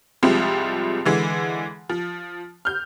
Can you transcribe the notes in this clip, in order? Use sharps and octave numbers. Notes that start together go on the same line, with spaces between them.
C2 C3 F3 G3 G#3 C4
D3 E3 G#3
F3
F6 G6